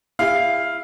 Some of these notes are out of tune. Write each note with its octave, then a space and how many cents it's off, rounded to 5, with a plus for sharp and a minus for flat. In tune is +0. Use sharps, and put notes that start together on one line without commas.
E4 +10 G#4 -45 F5 +0